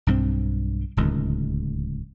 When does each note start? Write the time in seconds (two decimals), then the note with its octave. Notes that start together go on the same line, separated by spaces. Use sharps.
0.07 B1 G2 G#3 C4
0.97 D1 C#2 D#3